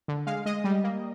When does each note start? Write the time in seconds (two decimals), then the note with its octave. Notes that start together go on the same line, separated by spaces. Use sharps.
0.08 D3
0.27 G#3 F5
0.46 G#3 D#5
0.64 G3
0.84 A#3